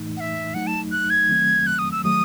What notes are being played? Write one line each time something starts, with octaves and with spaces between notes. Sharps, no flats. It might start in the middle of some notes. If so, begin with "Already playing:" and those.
Already playing: A2 E3 A3 D#4
F#5
E5
F#3 A3 D#4 F#5
A5
F#6
G#6
D#3 F#3 A3 C4
F#6
D#6
E6
D#3 F#3 A3 D#6